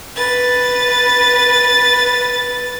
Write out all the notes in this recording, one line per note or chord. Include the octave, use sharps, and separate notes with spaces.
B4 A6